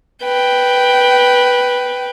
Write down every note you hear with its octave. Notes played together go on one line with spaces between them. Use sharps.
B4 G5